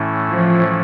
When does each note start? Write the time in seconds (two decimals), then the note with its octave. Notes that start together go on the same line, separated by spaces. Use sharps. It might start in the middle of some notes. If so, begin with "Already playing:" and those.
Already playing: A2 E3 A3 C#4 E4
0.28 F3